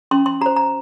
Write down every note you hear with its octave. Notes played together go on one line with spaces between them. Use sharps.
C#4 C6
C6
F#4 C5 A#5
A#5